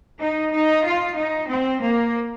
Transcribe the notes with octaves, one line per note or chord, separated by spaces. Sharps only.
D#4
D#4
F4
D#4
C4
A#3